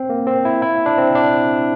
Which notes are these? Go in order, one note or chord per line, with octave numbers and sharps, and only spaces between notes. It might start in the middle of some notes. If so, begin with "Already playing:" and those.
Already playing: C4
A#3
C4
E4
E4
D4
C4
D4